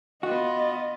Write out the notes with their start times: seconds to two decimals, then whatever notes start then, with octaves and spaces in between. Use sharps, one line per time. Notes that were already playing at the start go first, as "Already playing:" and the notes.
0.23 B3 F4 F#4 D#5